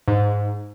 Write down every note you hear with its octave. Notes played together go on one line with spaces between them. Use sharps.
G#2